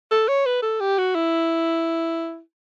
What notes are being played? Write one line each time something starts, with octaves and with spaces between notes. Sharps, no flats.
A4
C#5
B4
A4
G4
F#4
E4